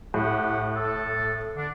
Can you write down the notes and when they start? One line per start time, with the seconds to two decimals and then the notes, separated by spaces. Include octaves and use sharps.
0.14 A2 E4 G4 F#5
0.76 A4
1.55 D3 D4